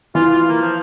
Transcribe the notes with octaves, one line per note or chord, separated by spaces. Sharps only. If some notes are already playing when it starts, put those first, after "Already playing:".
E3 F4
F4
A#3
F3